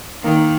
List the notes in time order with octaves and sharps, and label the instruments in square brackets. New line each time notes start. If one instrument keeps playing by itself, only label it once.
[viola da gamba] D#3 [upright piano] A#3